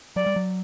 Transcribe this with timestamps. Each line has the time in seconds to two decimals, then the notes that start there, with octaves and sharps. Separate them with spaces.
0.16 F#3 D5
0.26 G3
0.36 F#3